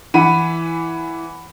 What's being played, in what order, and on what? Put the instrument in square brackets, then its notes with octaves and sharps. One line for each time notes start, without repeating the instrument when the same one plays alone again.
[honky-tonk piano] E3 [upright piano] F#5 B5 D#7